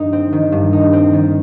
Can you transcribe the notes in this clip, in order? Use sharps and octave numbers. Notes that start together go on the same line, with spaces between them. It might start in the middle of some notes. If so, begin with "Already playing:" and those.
Already playing: G2 D#3 D#4
C4
D#3
G2
D#4
C4
D#3